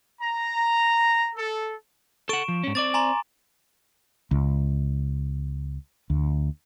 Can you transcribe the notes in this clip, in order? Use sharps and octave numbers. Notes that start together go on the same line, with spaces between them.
A#5
A4
A4 F#5 C#6 D7 E7
F3
G#2 C#4
C4 D5 D6 A6
G#5 A#5 C6
C#2
D2